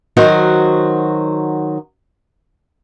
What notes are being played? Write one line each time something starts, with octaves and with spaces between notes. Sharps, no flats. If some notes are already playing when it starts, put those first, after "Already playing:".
D#3 F#3 F#4 C5